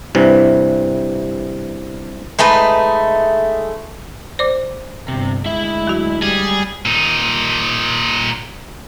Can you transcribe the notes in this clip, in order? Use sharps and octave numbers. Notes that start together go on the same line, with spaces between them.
G2 C3 E3
G#3 A3 D#4 B4
C5 D5 D6
G1 C3
D2 G#3 E4 E5
F#3 F#4
G3 G#4
A#2 D#4